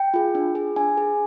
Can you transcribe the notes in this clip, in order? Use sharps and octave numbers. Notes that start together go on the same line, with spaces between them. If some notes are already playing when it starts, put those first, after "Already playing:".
Already playing: G5
F4 G#4
D4
G#4
D4 G#5
G#4